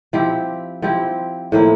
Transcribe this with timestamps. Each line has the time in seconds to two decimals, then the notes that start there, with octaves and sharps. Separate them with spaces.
0.13 F3 C4 E4 G4
0.82 F3 C4 E4 G4
1.52 A2 F3 A#3 E4